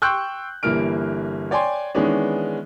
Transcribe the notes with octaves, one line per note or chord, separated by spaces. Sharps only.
G5 C6 C#6 E6 F#6 G6
G1 E3 G3 A#3 F6 D7
C#5 D5 G5 G#5 C6
D#3 E3 G#3 B3 C#4 D4